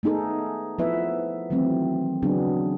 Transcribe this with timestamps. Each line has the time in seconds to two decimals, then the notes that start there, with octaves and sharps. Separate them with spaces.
0.03 A3 B3 D#4 G#4 A4
0.79 F3 B3 E4 B4 E5
1.50 D#3 E3 F#3 A3 C4
2.22 C#3 F#3 B3 D4 G#4